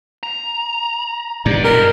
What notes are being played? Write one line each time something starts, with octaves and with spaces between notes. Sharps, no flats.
A#5
G2 B2 D5
E2 G4 A#4